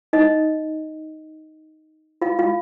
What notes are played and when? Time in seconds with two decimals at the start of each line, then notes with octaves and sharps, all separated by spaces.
0.13 D#4 D#5
2.21 F4 F5
2.39 F4 F5